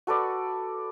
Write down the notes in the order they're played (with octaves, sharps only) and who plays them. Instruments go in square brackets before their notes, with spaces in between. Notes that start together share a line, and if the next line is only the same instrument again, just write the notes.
[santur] F#4 A4 B4 D5